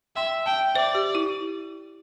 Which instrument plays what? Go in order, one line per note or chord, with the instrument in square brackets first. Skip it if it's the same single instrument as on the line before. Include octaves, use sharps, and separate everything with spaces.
[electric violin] E5 [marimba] G5 C6
[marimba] E5 A5 [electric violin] G5
[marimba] C5 E5 [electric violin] D5
[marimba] G4
E4